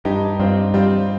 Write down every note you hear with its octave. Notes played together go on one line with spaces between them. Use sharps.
G2 D#4 G4
G2 C4 F4
G3 C4 F4